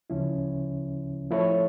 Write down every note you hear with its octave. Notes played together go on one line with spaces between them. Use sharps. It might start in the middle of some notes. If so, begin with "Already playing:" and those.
D2 C#3 F3 C#4 E4
F3 A3 E4 A4 C#5